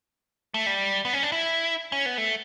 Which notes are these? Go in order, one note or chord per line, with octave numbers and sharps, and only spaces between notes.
A3
G3
B3
C#4
D4
E4
C#4
B3
A3